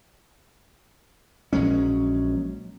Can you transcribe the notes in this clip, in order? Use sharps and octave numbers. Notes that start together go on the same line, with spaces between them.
A#1 F#3 G#3 C#4